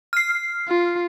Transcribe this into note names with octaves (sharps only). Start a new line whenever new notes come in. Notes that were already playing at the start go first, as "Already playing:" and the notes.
F6 C7
F4